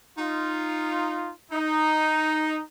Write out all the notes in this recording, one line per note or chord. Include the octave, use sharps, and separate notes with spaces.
D#4 F4
D#4